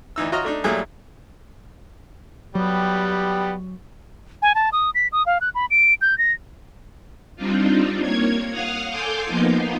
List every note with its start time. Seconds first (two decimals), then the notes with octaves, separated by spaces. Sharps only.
0.16 D2 E3 D#4 E6
0.32 F4 F#4 C#5 D#5 A#5 F6
0.45 A3 D4 D#4
0.64 A#2 F#3 G3 A3 E4 G#4
2.55 F#3 G3 B3 G4
4.42 G#5
4.55 A5
4.72 D#6
4.95 B6
5.12 D#6
5.26 F5
5.41 F#6
5.55 B5
5.70 D7
6.01 G6
6.18 A#6
7.36 G3 C4 D4 D#4 F4
8.00 A#3 C#5 G#6
8.50 F5 F#5 D#6 F6
8.89 A4 G#5 C6 D6 G6
9.26 F3 A#3 B3 D#4 F4